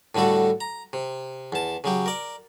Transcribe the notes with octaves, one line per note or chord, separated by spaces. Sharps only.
A2 D3 G3 F#4 A4
A#5
C3
E2 A5
C#3 F#3 G4
A#4 D5